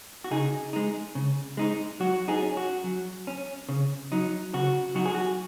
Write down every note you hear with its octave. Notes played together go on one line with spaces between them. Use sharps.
F#4
C#3 D#4 G#4
G#3 D#4
C#3
G#3 D#4
F#3 F#4
D#4 G#4
C#4
F#4
F#3
C#4
C#3
F#3 D#4
C#3 F#4
F#3 D#4 F#4
G#4
F#4